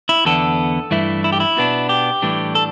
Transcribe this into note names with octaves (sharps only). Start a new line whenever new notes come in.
E4
E2 D3 B3 A4
G2 E3 A3 E4
E4
G4
E4
B2 B3 D4
G4
A2 E3 G3 D4
A4